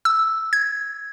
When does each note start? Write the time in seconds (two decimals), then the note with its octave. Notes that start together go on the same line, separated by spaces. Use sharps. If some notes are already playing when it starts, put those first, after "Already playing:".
0.05 E6
0.53 G#6